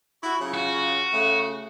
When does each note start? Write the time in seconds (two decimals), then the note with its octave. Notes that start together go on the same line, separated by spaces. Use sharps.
0.22 E4 F#4
0.40 C#3 F#3 F4
0.54 F#4
1.13 C#3 A3